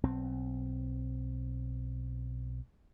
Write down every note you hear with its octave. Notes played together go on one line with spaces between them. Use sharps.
B1 C4